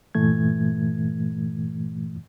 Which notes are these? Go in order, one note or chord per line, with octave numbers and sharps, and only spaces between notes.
G2 A#2 E3 A3 G#6